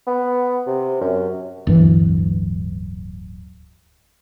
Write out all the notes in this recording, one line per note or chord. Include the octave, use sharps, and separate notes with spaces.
B3
C3
F#2
D1 G2 E3